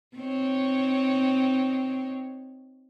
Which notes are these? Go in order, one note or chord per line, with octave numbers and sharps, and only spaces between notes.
C4 D#4 C#5